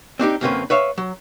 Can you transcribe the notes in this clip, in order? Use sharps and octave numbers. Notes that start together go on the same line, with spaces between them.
C4 D4 D#4 G4
F#2 D3 A#3 C4 C#4 B4
B4 C#5 E5 F5
F#3